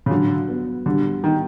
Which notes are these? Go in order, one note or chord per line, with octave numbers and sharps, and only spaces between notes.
C#3
D3 F#3
B3
D3 G3
D#3 B3